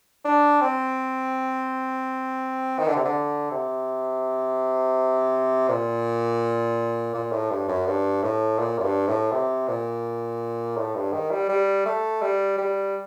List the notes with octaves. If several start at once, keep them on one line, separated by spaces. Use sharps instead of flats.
D4
C4
D#3
D3
C3
D3
C3
A#2
A#2
A2
G2
F#2
G2
A2
A#2
F#2
G2
A2
C3
A#2
A2
G2
D#3
G3
G3
A3
G3
G3